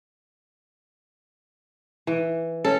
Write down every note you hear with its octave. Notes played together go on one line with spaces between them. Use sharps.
E3
C#4 A4